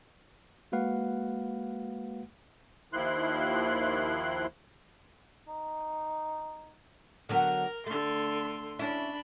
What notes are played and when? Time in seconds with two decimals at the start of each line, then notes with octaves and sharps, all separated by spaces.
0.72 G#3 A#3 F#4 B4 F5 F#5
2.93 D#2 D#3 F3 E4 C6 F#6
5.48 D#4
7.29 D3 F#3 B3 A#4
7.86 D3 A3 C6
8.79 C#4 D4 E4 B5